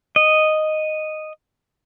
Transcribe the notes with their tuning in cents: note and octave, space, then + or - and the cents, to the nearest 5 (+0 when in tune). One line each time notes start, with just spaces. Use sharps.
D#5 -5